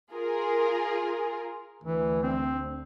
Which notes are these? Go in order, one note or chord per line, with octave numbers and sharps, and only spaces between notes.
F4 G#4 A#4
D2 E3
C4